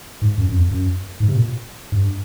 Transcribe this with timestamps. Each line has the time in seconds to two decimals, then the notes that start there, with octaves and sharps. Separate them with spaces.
0.22 G#2
0.38 F#2
0.49 F#2
0.54 F2
0.71 F#2
1.20 G#2
1.28 C3
1.36 A#2
1.92 G2